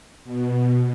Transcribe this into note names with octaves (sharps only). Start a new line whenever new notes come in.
B2